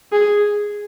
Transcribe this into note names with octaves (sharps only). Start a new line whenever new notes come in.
G#4